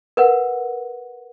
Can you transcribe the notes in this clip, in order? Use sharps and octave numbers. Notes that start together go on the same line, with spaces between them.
A#4 B4 F#5